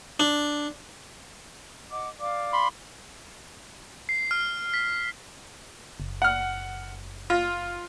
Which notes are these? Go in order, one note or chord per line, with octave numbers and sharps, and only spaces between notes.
D4
D#5 F#5 D6
D5 F5 D6
B5 C6
C7
F6
B6
F#1
F#5 F6
F4